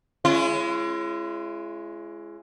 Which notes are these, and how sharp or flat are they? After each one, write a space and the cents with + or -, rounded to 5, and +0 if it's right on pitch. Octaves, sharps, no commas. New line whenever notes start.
G#3 +10 C#4 -25 E4 +45